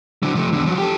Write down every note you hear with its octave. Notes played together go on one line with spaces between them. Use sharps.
D3 F#3
F3 A3
E2 D3
F3 F#3
G4 A4